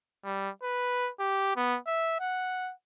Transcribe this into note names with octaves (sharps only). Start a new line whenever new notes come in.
G3
B4
G4
B3
E5
F#5